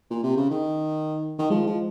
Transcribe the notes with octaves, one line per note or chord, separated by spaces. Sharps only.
A#2
C3
C#3
D#3
D#3
F3 G#3
F3